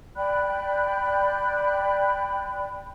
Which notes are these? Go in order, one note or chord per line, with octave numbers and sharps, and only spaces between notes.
D5 G5 B5 F#6